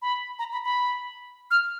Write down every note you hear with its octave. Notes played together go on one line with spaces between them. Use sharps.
B5
A#5
B5
B5
F6